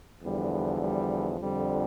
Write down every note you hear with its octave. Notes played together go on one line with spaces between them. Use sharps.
E2 D3 F3 G3
G3
G3
F2 D3 F3 G3